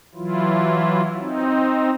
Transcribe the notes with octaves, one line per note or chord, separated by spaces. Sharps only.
E3 F#3 E4 F4
C4 D#4